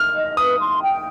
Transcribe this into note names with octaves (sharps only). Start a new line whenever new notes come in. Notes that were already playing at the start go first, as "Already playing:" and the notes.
Already playing: F6
D#5
B4 D#6
C6
G5